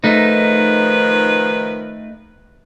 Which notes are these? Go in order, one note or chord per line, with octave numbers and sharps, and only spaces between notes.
D#3 F3 A3 D#4 B4